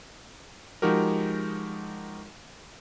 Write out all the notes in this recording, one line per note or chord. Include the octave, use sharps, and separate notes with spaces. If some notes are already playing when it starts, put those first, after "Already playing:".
F3 G#3 D#4 F#4 G4 A#4